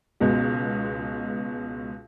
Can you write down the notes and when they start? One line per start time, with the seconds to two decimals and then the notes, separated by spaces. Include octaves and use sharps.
0.20 C#2 B2 G#3